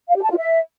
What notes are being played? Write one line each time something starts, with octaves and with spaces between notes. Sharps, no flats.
F5
G4
A5
F4
E5